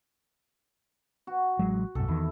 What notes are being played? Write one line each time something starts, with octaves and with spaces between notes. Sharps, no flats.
F#4
A1 F#3 G#3
B1 F#2 A4
E2 D#3 E4